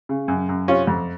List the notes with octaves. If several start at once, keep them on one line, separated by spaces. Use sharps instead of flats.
C#3
F#2
F#2
C3 C#4 F4
F2